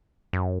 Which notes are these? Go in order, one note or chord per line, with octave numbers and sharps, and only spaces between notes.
F#2